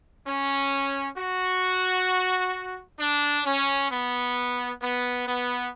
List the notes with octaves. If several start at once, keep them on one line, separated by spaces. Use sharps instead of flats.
C#4
F#4
D4
C#4
B3
B3
B3